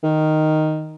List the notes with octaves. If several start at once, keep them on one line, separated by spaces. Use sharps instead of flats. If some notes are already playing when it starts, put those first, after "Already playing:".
D#3